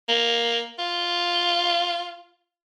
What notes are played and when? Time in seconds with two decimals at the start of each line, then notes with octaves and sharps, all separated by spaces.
0.08 A#3
0.79 F4